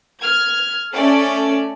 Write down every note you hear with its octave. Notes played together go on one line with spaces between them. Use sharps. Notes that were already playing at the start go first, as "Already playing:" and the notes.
F6 G#6
A3 C#4 A4 D5